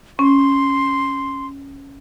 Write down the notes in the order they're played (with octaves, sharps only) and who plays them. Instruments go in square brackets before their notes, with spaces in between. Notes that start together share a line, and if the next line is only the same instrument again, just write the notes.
[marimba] C#4 [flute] C6